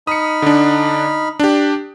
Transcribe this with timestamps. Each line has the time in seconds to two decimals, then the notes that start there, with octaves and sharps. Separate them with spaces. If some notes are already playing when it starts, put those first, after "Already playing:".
0.07 D#4 B5 D#6 F6 C#7
0.42 D3 D4
1.39 D4 G4